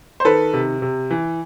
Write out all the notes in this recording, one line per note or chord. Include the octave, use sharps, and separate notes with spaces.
C5
D#3 A4 B4
C3
C3
E3